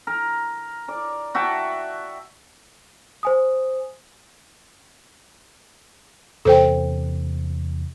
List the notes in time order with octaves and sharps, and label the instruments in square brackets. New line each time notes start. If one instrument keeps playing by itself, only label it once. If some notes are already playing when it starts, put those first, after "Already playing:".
[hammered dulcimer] A#4
A#4 D5
F#4 E5 G5 A5
[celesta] C5 G#5 D#6
[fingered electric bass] E2 C3 A#3 [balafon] A4 C5 G5